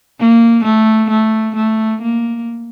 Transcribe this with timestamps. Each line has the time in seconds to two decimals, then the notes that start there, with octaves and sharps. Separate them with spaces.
0.20 A#3
0.64 A3
1.10 A3
1.56 A3
2.02 A#3